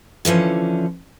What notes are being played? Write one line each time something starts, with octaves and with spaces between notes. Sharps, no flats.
D3 E3 F3 C#4